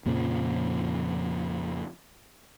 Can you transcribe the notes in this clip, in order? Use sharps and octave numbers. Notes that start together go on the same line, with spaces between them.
F2 A#2 C#3 F3